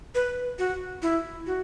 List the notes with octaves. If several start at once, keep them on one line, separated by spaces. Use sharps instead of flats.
B4
F#4
E4
F#4